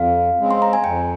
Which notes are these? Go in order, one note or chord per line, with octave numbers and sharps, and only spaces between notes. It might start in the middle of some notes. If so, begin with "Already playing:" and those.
Already playing: F2 F5
C#3 G#3 C4
C6
A#5
G#5
F2 G5